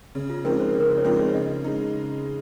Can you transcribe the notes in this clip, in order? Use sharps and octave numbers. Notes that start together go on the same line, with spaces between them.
C#3
F4
F3 G#3 C4 D#4 A#4
C5
C#3 A#4
C5
C#5
F3 G#3 C4 D#4 C5
C#5
C#3 D#5
G#3 D#4